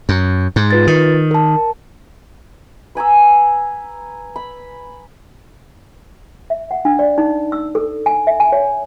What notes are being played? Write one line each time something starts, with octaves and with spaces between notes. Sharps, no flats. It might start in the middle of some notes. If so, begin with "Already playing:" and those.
F#2
G#2
F4 B4 A6
D#3
A#4 A5
B4 G#5 A#5 E6
B5
E5
F#5
D4
D5
D#4
E6
A4
G#5
E5
G#5
C#5